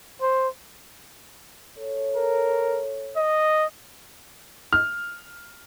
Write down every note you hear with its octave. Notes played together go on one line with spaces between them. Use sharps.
C5
A4 C#5
A#4
D#5
F6